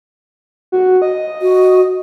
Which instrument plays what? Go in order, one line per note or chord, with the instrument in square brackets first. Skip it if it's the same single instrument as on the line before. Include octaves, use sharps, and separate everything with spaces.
[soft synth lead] F#4
D#5
[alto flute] F#4